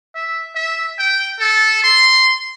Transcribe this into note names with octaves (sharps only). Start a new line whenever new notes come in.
E5
E5
G5
A4
C6